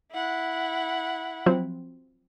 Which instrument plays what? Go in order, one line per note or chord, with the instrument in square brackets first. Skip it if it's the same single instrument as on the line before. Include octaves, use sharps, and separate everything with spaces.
[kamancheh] E4 F#5
[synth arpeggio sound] F3 F#3 C4